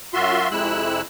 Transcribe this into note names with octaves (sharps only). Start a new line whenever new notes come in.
F#2 F4 F#4 E5 C6
F2 C3 G#3 E4 E6 F#6